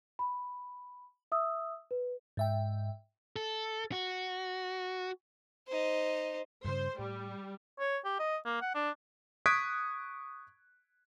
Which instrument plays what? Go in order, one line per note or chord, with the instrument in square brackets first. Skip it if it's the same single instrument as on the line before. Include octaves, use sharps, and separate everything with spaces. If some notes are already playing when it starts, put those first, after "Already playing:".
[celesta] B5
E5 D#6 E6
B4
[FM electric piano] G#2 E5 G5
[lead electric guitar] A4
F#4
[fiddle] D#4 C5
[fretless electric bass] G2 C#3 [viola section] C5
[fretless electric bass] A2 [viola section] G3
[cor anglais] C#5
G4
D#5
A#3
F#5
D4
[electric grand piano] C#6 D#6 F#6 G#6 B6 D7